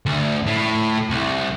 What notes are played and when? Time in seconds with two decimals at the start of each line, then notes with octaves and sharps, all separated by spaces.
0.06 D2
0.46 A2
1.10 C2